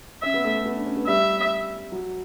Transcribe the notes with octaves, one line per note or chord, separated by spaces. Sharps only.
C#4 E5
B3
A3
A3
B3
D4
C#4
B3
G3 E5
F#3